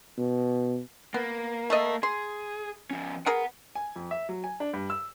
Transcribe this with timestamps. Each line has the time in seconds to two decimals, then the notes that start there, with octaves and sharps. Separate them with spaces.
0.18 B2
1.14 A#3 B3
1.70 A3 A4 D#5
2.03 G#4 C6
2.91 F3 C#4
3.26 G#4 A#4 B4 F#5
3.75 G#5
3.96 F2
4.11 E5
4.29 F#3
4.44 G#5
4.60 D4
4.73 G2
4.90 E6